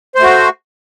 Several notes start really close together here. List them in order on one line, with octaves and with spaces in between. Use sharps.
C5 A3 F#4